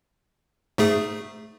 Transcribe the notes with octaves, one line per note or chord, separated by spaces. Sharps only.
G#2 A3 G#4